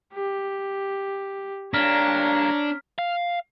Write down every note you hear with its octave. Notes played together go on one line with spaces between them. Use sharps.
G4
G2 A#3 D4 C#5 A#5 F6 B6
F5